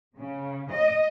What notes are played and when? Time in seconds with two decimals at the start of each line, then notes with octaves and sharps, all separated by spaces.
0.18 C#3
0.71 D#5